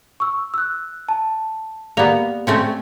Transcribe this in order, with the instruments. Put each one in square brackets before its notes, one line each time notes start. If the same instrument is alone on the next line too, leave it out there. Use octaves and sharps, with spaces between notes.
[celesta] C#6 E6
E6 F#6
A5
[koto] A#3 B3 [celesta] G4 D5 F7
[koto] A3 C4 C#4